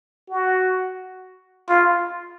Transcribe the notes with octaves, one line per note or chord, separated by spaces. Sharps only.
F#4
F4